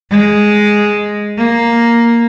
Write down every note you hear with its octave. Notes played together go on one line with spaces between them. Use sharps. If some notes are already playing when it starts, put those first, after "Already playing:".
G#3
A#3